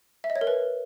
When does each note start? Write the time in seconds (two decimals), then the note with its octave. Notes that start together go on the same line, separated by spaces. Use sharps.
0.24 E5
0.30 D#5
0.36 C#5
0.41 A#4
0.47 B4